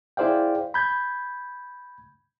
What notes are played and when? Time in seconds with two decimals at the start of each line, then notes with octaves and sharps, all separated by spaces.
0.17 E4 G#4 C5 D5 F5 G5
0.74 B5 G6 G#6